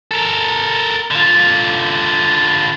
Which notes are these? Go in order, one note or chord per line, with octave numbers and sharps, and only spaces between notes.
A4 A#4
D3 F4